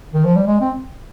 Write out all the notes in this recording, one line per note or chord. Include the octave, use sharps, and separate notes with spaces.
D#3
F3
G3
G#3
C4